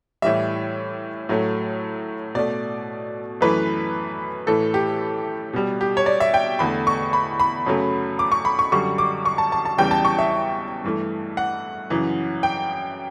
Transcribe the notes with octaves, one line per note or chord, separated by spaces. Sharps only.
A2 E3 G3 E5
A2 F#3 A3
B2 A3 D5
F#2 E3 A3 B4
A2 E3 A3 A4
G4
B2 G3
G4
C#5
D5
E5
G5
E2 D3 A3 B5
C#6
B5
B5
F#2 C#3 F#3 A3
D6
C#6
B5
C#6
F#2 D3 G3 C#6
D6
C#6
A5
A5
A5
E2 C#3 E3 G3 G5
A5
C#6
E5
G2 E3 A3
F#5
F#2 C#3 E3
G5